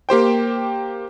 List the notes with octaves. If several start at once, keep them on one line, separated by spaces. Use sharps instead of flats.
A#3 G4 C5 G5